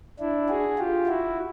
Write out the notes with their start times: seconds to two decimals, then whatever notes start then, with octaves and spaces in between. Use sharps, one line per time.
0.19 D4 E4
0.48 F#4 G#4
0.78 F4 G4
1.07 E4 F#4